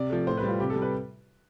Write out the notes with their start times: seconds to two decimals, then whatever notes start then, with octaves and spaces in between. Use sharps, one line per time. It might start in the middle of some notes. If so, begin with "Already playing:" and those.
Already playing: C3 D5
0.10 F3 A3
0.27 A2 C5
0.37 B4
0.43 G3
0.48 F4
0.60 C3 G4
0.70 A4
0.76 G3
0.82 B4